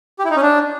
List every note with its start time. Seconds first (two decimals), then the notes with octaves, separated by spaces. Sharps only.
0.19 G4
0.25 E4
0.30 D#4
0.36 C#4
0.42 D4